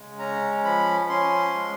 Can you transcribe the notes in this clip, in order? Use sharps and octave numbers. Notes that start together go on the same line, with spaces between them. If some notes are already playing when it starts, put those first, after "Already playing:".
Already playing: C#3 G#3
C#4 A#5
F3 B5
C#4 C6
G#3